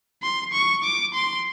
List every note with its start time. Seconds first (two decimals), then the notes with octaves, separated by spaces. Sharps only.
0.23 C6
0.53 C#6
0.84 D6
1.14 C6